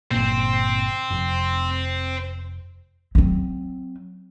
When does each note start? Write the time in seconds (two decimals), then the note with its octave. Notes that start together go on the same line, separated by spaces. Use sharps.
0.11 G1 A#2 C4
1.10 F1
3.15 F#3 C4